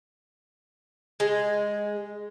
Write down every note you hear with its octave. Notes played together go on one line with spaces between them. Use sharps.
G#3